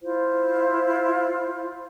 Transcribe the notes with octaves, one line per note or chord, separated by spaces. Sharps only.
E4 F4 C5